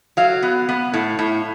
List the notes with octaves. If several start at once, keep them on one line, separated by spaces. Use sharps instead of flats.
F#3 F5
B3
B3
A2
A2